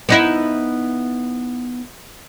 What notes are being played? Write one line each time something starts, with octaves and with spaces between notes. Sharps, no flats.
B3 D#4 E4